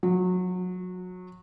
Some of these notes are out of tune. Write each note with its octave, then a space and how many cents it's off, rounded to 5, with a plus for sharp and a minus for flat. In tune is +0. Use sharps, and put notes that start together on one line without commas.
F#3 -25